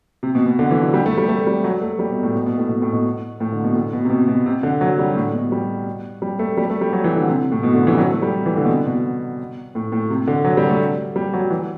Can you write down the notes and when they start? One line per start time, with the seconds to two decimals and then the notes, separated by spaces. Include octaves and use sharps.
0.23 C3
0.35 B2
0.46 B2
0.59 D3
0.71 E3
0.81 F#3
0.94 G3
1.06 A3
1.18 G3
1.29 A3
1.47 G3
1.64 F#3
1.82 A3
1.99 G3
2.11 B2
2.23 A2
2.35 B2
2.46 B2
2.58 A2
2.69 B2
2.82 A2
2.93 B2
3.40 A2
3.52 D3
3.64 B2
3.75 A2
3.93 B2
4.05 C3
4.10 B2
4.28 B2
4.46 C3
4.63 D3
4.81 F#3
4.99 G3
5.16 A2
5.34 B2
5.52 G3
6.22 G3
6.39 A3
6.57 G3
6.70 A3
6.81 G3
6.93 F#3
7.04 E3
7.16 D3
7.28 C3
7.51 A2
7.63 B2
7.75 D3
7.87 E3
7.94 G3
7.98 F#3
8.10 A3
8.22 G3
8.46 E3
8.57 D3
8.65 B2
8.69 C3
8.86 B2
9.75 A2
9.92 A2
10.10 C3
10.27 D3
10.45 F#3
10.57 G3
10.69 A3
11.16 G3
11.34 F#3
11.51 E3